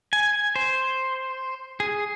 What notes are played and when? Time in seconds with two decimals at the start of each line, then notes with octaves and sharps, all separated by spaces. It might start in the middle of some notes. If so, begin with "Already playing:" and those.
0.13 G#5
0.56 C5
1.80 G#4